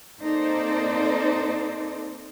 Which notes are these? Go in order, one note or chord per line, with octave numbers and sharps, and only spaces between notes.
A#3 C4 D#4 A4 C5 D5